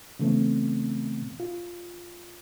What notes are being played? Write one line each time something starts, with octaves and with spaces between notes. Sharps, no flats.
C#3 E3 A3 B3 C4
F4